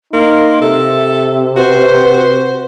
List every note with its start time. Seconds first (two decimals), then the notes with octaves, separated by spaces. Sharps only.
0.13 A#3 D#4 C6
0.62 C3 A4 E5
1.56 F#4 B4 C5